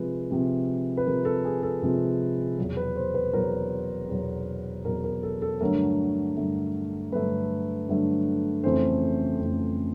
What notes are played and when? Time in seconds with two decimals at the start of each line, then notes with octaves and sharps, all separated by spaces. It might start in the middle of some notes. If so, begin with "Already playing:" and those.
Already playing: C3 F3 G#3 B4
0.31 C3 F3 G#3
0.97 B4
1.06 C3 F3 G#3 A#4
1.25 A4
1.45 G#4
1.63 A4
1.82 C3 F3 G#3
2.58 E2 B2 F#3
2.77 B4
2.96 C5
3.15 B4
3.33 E2 B2 F#3 A#4
4.09 E2 B2 F#3
4.85 E2 B2 F#3 A#4
5.04 A#4
5.23 A4
5.42 A4
5.61 G2 D3 F#3 A3 A#4
6.37 G2 D3 F#3 A3
7.12 G2 D3 F#3 A3 B4
7.88 G2 D3 F#3 A3
8.64 F2 C#3 E3 A3 C5
9.40 F2 C#3 E3 A3